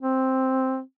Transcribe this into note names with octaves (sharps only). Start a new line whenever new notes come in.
C4